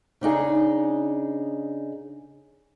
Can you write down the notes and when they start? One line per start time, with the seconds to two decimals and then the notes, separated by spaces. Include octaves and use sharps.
0.21 C#3 D4 D#4 G#4